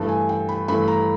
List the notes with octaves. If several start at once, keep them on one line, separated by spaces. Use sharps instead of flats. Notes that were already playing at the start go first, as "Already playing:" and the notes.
Already playing: G2 E3 A3 A5
G#5
G5
B5
G2 E3 A3 B5
A#5